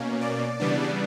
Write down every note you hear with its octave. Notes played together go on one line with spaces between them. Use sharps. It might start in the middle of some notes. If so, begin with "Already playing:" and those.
Already playing: B2 A#3 C#4
D5
C#3 E3 G3 B3 D4